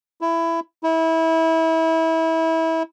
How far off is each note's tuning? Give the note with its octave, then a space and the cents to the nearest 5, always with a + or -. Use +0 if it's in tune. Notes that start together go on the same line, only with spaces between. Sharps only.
E4 +15
E4 -25